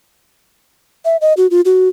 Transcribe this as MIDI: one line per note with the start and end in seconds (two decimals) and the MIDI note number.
1.05 1.17 76
1.21 1.33 75
1.37 1.47 66
1.51 1.61 65
1.65 1.88 66